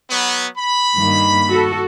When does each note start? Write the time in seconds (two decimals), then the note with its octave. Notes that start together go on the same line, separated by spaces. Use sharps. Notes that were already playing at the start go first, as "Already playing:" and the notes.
0.11 F#3 B3
0.58 B5
0.95 G2 D#3 A#3
1.46 F#4 A4